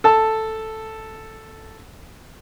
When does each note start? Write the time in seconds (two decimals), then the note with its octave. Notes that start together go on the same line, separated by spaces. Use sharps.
0.04 A4 A5